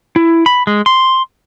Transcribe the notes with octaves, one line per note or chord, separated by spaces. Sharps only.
E4
B5
G#3
C6